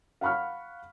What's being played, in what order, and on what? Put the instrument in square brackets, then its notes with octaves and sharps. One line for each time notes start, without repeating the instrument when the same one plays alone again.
[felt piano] F5 F#5 B5 C#6 F6